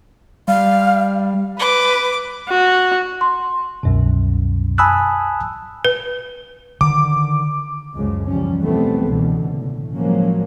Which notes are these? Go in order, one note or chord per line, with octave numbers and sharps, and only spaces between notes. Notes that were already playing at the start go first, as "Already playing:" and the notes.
G3 F5
B4 D6
F#4
C6
C2 F#2 B2
G#5 A5 B5 D#6 E6 F#6
B4
D3 D#3 D6
C#2 F#2 C#3 F3 G#3
E2 F3 G3 C#4
B2 E3 G3 A3 B3 C4
C#2 B2 D3 E3
A2
F3 F#3 G#3 A#3 C#4